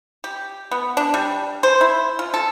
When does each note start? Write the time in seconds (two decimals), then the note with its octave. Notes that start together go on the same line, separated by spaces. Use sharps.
0.24 G4
0.71 B3
0.97 D4
1.14 G3
1.63 C5
1.81 E4
2.19 F4
2.34 A4